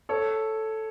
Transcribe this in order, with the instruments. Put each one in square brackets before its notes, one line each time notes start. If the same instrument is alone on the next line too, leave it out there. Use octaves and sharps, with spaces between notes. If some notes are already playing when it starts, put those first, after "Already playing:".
[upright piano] A4 C#5